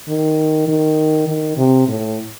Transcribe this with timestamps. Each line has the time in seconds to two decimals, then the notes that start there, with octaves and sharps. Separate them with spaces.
0.08 D#3
0.68 D#3
1.28 D#3
1.58 C3
1.88 A2